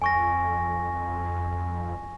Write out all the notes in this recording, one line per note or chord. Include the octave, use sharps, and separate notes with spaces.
F2 G#5 C#6 A#6